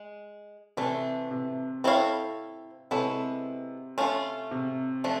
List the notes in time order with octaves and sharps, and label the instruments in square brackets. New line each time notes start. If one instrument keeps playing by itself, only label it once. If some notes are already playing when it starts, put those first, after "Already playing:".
Already playing: [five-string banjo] G#3
[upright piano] C3 [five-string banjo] E3 A3 D4
[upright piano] C3
[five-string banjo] C4 E4 A4 C#5 F5
[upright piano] C3 [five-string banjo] G#3 B3 E4 A4 C#5
[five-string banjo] A3 C#4 F4
[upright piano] C3
[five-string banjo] F3 A3 D4